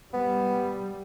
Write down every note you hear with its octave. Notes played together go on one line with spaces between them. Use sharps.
G3 B3